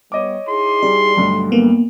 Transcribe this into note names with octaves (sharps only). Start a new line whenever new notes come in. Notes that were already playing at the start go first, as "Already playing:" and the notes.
G3 B3 C#5 D#5 D6
D#4 E4 G#4 C6
G3 D5
B1 G2 D3 A3
A#3 B3